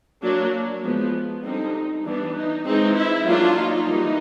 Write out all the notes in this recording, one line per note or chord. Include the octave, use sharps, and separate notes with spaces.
F#3 A#3 D4
F3 G#3 B3
D3 G3 C4 D#4
E3 G3 B3 D4
D#4
E3 G#3 C4 D#4
E4
F#3 A#3 D4 F4
D#4
E3 G3 A#3